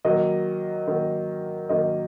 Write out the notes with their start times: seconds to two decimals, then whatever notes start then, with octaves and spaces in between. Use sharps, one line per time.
0.05 D#3 F#3 A#3 D#5
0.88 D#3 F#3 A#3
1.69 D#3 F#3 A#3 D#5